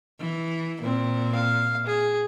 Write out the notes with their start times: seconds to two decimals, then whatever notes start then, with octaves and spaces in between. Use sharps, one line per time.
0.20 E3
0.83 A#2 C4
1.35 F5
1.86 G#4